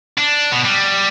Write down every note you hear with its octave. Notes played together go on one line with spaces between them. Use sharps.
D4
B2
G3